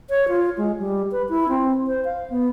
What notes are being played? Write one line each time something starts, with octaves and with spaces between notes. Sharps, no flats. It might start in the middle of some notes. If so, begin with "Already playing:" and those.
C#5
F4
G#3
G3
B4
E4
C4
C5
F5
B3